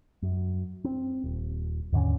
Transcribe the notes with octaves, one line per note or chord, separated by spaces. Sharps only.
F#2
C4
D#1
D#2 G#2 D3 C#4